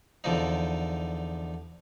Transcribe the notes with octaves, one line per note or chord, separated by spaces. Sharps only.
E2 D3 F3 D#4